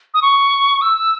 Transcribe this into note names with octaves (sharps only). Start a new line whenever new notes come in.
D#6
C#6
E6